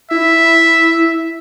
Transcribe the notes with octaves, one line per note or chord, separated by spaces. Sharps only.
E4 E5